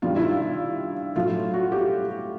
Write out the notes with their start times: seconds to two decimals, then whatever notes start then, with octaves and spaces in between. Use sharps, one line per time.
0.02 G2 D#3 G3 F4
0.16 E4
0.29 F4
1.16 A2 F#3 F4
1.54 F#4
1.72 G4